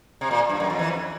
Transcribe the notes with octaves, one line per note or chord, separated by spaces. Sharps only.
C3
A#2
G2
F#2
F2
E3
F2